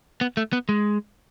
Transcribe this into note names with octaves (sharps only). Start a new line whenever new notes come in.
B3
A3
B3
G#3